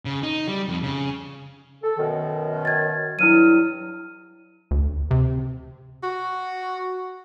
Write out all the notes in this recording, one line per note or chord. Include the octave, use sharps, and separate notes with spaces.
C#3
D#4
G3
F2
C#3
A4
F#2 B2 D#3
G#6 A6
G2 F#3 E4 F6 D#7
D2
C3
F#4